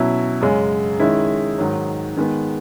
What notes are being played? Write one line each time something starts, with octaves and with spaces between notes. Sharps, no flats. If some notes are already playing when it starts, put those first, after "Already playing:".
Already playing: B2 F#3 C#4 E4
F#2 C#3 G#3
D#3 G#3 C#4 E4
G#2 D#3 F#3
D#3 G#3 B3